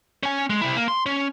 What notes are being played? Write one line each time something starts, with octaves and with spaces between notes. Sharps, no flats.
C#4 G#5
G#3
C3 E4
A#3
C6
C#4